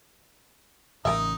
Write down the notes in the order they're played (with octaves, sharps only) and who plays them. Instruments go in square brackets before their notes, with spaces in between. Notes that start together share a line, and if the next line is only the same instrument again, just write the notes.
[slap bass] A1 A2 C#3 [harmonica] D#4 D#5 [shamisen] A#4 E5